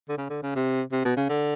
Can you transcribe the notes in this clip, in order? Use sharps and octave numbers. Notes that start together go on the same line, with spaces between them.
D3
C#3
D3
C#3
C3
C3
B2
C#3
D3